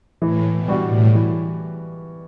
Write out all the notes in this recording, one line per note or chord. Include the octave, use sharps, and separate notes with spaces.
A2 E3
B2
G3 D4 F#4
A2
E3